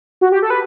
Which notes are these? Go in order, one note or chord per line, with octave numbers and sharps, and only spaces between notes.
F#4
G4
A4
B4